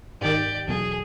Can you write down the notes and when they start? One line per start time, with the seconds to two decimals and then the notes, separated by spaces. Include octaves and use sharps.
0.21 G#2 D#3 G4 D5
0.68 E2 B2 F#3 G#4